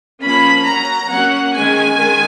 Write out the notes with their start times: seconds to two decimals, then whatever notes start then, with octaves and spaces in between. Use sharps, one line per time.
0.22 F3 A#3 C#4 B5
0.65 F#3 C#4 A#5
1.09 F#3 A#3 C#4 F#5
1.53 D#3 G#3 C#4 G#5
1.97 D#3 G#3